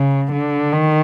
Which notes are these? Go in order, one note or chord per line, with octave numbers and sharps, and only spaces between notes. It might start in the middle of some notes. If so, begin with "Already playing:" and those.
Already playing: C#3
D3
D#3